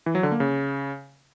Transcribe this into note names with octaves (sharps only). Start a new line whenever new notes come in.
E3
F#3
D3
A#3
C#3